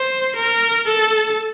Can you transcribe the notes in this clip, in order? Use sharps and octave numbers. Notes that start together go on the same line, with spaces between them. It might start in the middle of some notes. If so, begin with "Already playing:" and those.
Already playing: C5
A#4
A4